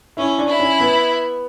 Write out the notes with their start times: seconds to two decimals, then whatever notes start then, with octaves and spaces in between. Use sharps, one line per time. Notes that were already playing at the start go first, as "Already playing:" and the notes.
0.17 C#4 E4
0.38 D4
0.48 E4
0.60 C#4
0.80 B3